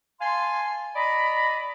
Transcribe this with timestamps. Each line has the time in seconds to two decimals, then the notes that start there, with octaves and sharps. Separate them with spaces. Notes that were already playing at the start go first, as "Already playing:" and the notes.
0.21 F5 G#5 A5 C6
0.96 D5 D#5 A#5 B5